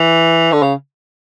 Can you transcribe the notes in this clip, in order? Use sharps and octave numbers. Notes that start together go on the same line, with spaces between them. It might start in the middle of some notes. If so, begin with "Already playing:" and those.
Already playing: E3
D3
C#3